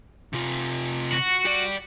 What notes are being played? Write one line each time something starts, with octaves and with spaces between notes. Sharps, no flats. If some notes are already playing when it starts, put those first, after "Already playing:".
C3 F4
F#4
G4 D5